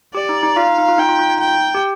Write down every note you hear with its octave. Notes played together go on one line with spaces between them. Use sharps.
G4 D5
D#4
D#4
F4 F5
D#4
D#4
F4
D#4 G5
F4
F4
D#4
G5
G4